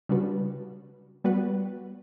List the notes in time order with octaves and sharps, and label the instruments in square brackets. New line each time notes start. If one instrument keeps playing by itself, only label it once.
[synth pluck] C#3 G3 D4 F#4 B4
G3 B3 F#4 B4